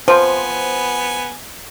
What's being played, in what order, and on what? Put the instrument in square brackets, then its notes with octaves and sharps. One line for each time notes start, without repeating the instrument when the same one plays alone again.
[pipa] F3 [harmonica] B3 G#5 [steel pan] C5